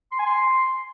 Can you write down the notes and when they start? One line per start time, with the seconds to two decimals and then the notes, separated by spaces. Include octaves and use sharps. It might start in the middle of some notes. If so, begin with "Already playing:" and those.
0.12 C6
0.19 G#5
0.26 C6